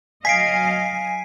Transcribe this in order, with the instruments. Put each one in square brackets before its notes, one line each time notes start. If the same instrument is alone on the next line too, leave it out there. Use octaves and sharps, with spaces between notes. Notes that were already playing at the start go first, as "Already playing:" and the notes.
[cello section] F#3 D#5 F5 [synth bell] G#5 [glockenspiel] B6 C7 D7